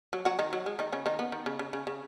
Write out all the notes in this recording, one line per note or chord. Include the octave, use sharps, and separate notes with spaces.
F#3
F#3 F#4
D#3 D#4
F#3
G#3
D#3 D#4
C#3 C#4
D#3 D#4
B3
D#3
C#3
C#3
C#3
C#3